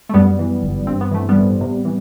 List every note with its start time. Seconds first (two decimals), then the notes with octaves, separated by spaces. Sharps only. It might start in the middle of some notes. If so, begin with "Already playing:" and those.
0.09 A3
0.14 F#2 G3 B3
0.39 E3
0.63 G1
0.87 G2 C4
1.01 B3
1.11 E3 A3
1.29 G3 B3
1.36 A1
1.61 C3
1.85 E3